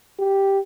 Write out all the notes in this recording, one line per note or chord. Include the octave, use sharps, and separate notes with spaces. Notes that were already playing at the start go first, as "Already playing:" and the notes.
G4